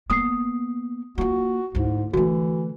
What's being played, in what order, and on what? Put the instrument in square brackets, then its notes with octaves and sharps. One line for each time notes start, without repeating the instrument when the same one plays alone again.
[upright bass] A#3 B3 [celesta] D#6 C7
[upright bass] A#3 F4 [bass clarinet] F#4
[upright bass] D2 E4 [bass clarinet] G#2
[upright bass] D3 A3 [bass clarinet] E3 [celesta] F#4